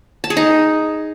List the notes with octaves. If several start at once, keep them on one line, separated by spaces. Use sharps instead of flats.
A5
G#4
D#4